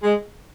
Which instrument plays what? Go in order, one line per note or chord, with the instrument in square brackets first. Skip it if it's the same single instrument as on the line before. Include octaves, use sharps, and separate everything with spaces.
[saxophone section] G#3